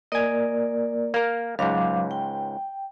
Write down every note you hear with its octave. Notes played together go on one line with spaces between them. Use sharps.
A#3 A#4 D5 D#5 G#5
A#3 A#4
C#2 G#2 F#3 F5 D6
G5